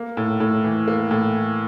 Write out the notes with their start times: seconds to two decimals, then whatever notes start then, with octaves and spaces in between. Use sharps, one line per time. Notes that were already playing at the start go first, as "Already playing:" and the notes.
Already playing: A#3
0.17 A2
0.40 A2
0.64 E3
0.88 A#3
1.11 A2